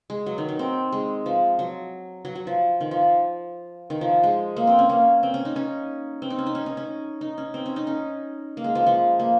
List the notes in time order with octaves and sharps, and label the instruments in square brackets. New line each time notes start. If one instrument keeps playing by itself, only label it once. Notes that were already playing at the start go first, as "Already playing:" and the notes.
[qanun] G#3
F#3
D#3
D#3
C4
G#3
F3
F#3
F#3
F#3
F3
D#3
F3
D#3
F3
G#3
A#3
C4
C#4
A#3
C4
C#4
D#4
C#4
C4
D#4
C#4
D#4
C#4
C#4
C#4
D#4
C#4
C4
C#4
D#4
C#4
A#3
G#3
F3
F3
A#3